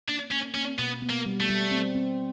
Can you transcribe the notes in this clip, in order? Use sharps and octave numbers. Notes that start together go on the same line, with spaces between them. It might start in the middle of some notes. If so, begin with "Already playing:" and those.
A#3 D4
A#3 C#4
A#3 C#4
B2 B3
B3
A#3
G3
A3
G3
C4
C4